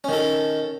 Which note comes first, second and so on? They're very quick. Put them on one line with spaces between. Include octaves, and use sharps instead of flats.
C#4 D#3 A4